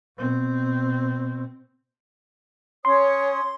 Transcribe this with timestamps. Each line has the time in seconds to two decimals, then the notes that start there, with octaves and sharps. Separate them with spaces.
0.17 B2 C4
2.85 C#4 C#5 C6 D#6